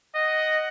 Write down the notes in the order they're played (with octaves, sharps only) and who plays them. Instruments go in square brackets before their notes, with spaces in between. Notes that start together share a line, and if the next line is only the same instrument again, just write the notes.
[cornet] D#5 [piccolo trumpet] F#5